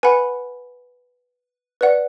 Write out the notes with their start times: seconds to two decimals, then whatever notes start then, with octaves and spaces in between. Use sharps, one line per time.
0.03 B4 F#5 G#5 B5
1.81 B4 D5 F#5